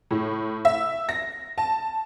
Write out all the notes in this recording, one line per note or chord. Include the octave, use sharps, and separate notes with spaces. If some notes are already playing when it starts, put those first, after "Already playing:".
A2
E5
A#6
A5